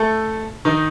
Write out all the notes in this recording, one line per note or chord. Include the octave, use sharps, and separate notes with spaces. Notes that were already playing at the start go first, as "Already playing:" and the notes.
Already playing: A3 A4
D#3 D#4